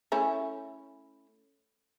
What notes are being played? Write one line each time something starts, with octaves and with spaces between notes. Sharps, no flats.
A3 C#4 E4